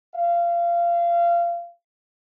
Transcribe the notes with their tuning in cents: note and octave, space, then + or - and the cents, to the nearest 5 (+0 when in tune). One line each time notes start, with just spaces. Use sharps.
F5 -25